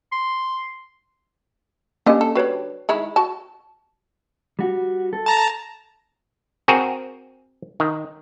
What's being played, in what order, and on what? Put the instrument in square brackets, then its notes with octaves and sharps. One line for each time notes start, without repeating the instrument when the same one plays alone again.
[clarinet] C6
[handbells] A#3 C#4 G4 [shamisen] D4 D#5
[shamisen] A4
[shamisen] D3 G3 [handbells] F#4 B4 C#5
[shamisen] D#3 G#3 E4
F#4 A5
[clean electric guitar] G3 F#4
A4
[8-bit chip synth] A5 A#5
[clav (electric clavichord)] C4 F#4 G#4 A#4
D#3